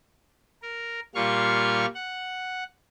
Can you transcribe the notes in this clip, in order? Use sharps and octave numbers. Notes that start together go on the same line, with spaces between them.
A#4
A#2 G3 F4 F5 C#6 F6
F#5